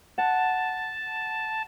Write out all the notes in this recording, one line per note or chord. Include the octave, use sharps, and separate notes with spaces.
F#5 A5